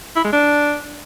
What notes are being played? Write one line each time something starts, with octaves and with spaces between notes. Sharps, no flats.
E4
G#3
D4